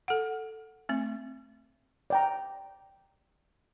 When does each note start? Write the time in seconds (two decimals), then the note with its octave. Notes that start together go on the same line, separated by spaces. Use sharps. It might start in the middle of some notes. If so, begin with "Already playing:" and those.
0.08 A4 F#5
0.89 A3 C4
2.10 D5 G5 A#5